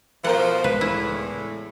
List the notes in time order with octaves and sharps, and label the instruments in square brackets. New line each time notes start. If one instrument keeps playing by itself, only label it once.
[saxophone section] B2 F3 [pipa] A4 A#4 C5 [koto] F#5
[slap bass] C#2 [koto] B4
[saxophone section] E2 A2 [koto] E4